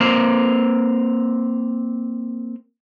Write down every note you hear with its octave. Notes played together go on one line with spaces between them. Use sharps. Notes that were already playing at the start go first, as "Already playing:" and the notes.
A#3 C4 F5